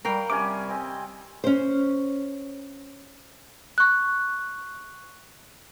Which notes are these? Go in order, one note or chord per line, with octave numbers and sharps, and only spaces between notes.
F#3 G3 A#4 F5 G5
C3 G3 C#4 G#5 D6
C4 D#5
C#4 C5
C#6 F#6